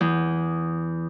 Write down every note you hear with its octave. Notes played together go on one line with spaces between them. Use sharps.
E2